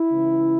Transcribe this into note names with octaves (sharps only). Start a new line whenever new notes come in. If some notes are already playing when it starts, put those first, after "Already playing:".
Already playing: E4
C#2 C#3 E3